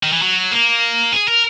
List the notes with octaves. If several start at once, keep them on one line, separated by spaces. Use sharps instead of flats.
D#3
E3
F#3
A#3
G#4
A#4